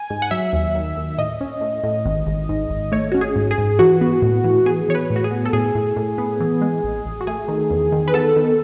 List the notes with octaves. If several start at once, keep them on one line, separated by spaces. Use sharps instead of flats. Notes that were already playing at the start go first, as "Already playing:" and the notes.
Already playing: G#5
G#2
F#5
F#3 E5
D#2
D#3
D#2
A2 D#5
C#4
A2
A2
G#1
G#1
G#2
G#1
A3 C#5
C#4 F#4
G#4
G#2
G#4
G#2
E3 F#4
B3
A2
E3
B3 G#4
E3 C#5
B4
A2
F#4
G#4
B3
A4
A2 G#4
A2
A2
B3
E3
G#3
A1
A1
F#4
A3 G#4
D#3
E2
D#3
B4
B3 A4
D#3